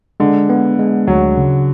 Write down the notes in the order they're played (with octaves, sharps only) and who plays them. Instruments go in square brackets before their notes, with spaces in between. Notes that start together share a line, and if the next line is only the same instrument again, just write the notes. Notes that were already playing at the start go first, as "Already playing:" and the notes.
[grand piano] D3 [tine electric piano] G#3
[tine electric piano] B3
G#3
[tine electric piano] D2 [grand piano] F#3
[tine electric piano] C#3